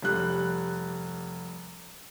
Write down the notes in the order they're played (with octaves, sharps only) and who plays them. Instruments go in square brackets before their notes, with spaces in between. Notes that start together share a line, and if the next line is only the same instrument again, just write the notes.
[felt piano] F1 G3 F#6